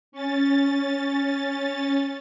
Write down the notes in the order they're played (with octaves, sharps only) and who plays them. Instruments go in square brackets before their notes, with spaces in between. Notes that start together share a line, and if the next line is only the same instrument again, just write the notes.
[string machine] C#4 A6